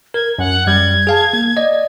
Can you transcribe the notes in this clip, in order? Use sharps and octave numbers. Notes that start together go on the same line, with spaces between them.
A#4 G#6
F#2 F#5
F#2 G3 G#6
G#4 F5 A5
A#3
D5 D#5